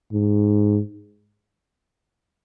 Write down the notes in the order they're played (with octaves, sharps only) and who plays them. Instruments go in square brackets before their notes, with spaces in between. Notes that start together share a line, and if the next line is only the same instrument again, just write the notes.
[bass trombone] G#2